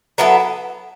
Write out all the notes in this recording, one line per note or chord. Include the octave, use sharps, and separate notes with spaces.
F#3 B3 E4 A4